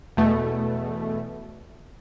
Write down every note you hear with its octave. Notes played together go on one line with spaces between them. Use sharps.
E2 B2 A3